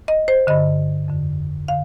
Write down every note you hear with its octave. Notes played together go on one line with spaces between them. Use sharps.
D#5
C5
G2 D3 D#5
F2 D3
D3 F5